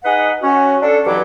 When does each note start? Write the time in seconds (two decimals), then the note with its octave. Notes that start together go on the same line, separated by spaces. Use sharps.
0.04 D#4 G#4 B4 D#5 F#5
0.42 C#4 F#4
0.81 D4 A4
1.06 G2 B2 E3 F#3 E4 D6